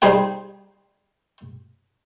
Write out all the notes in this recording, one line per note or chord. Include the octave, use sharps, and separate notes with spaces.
G3 D#4 G#4 C5 G5